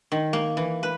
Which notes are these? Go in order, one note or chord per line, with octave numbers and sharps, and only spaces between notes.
D#3
A#3
E3
B4